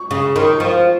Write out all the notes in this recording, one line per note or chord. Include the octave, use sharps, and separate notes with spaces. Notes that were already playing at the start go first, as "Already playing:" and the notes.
Already playing: C#6
C#3
D#3 C6
F3